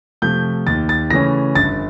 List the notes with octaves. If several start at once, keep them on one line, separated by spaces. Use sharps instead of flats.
C3 F3 A3 G6
D#2 A6
A6
C#3 E3 A3 C#4 A#6
G1 A6